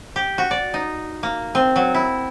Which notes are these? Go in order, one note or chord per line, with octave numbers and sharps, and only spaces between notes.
G4
F#4
D5
D#4
A#3
C4
F#3
E4